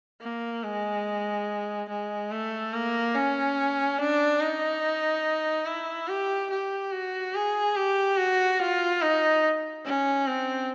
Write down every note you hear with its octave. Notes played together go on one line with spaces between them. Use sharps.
A#3
G#3
G#3
A3
A#3
C#4
D4
D#4
E4
G4
G4
F#4
G#4
G4
F#4
F4
D#4
C#4
C4